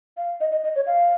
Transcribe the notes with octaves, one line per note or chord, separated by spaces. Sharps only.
F5
D#5
D#5
D#5
C#5
F5